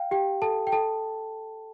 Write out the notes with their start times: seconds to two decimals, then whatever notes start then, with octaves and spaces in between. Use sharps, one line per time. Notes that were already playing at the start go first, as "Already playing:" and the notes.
Already playing: F5 G5
0.11 G4 G5
0.42 A4 A5
0.67 G5
0.72 A4 A5